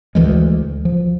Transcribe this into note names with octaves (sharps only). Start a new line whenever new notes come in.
D2 E3 G3 G#3
F3